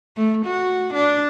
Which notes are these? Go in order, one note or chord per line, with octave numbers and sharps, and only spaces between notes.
A3
F#4
D4